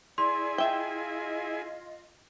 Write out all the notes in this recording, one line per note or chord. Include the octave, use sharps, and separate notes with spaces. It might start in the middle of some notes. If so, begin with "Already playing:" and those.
E4 G#4 D5 G#5 C6
F4 D#5 E5 G5